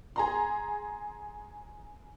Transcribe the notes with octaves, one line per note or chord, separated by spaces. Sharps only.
G#4 A#5 C6